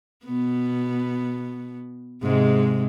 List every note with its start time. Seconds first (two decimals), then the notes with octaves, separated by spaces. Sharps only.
0.25 B2 B3
2.23 G#2 C3 G#3